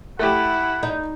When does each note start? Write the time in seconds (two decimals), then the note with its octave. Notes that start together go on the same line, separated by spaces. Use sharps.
0.19 A3 E4 G4 F#5
0.83 D#4